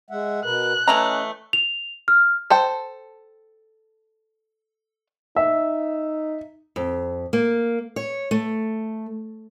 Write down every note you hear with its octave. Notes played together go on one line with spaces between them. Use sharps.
G#3 E5 F#5
B2 A#4 B4 F#6
E3 A3 C#4 D#5 A#5
F7
F6
A4 C5 G5
D#4 E5
F2
A#3
C#5
A3